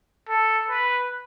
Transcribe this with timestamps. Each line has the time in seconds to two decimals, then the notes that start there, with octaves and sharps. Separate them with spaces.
0.29 A4
0.70 B4